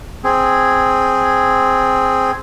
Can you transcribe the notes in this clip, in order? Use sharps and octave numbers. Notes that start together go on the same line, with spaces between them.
C4 G#4